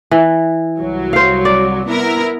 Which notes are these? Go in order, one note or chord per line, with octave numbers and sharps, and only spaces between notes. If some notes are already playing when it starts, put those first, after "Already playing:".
E3
C2 F#3
C5 F5
D5
B3 E4 A#4